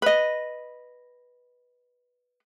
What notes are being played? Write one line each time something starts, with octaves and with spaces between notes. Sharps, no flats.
B4 D#5